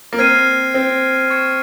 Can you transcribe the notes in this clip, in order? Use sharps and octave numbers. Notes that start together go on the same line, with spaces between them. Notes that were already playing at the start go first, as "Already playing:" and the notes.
A#3
C4 F6 G#6 C7 D#7
C4
C#6 G#6 C#7